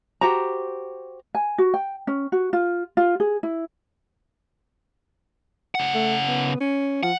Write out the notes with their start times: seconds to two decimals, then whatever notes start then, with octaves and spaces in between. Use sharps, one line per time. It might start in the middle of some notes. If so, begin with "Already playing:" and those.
0.21 F#4 G4 C5 A#5
1.35 G#5
1.58 F#4
1.74 G5
2.07 C#4
2.32 F#4
2.53 F4
2.97 F4
3.20 G#4
3.43 E4
5.75 C#3 F#5
5.94 A3
6.27 B3
6.60 C#4
7.03 F3 F#5